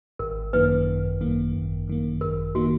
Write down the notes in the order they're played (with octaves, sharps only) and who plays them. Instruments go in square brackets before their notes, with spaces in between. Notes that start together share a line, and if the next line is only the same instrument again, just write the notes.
[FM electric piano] G#1 [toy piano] A#4
[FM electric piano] F#2 D#3 A#3 [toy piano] B4
[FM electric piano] G#1
F#2 D#3 A#3
G#1
F#2 D#3 A#3
[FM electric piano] G#1 [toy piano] A#4
[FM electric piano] D#3 A#3 [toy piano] F#4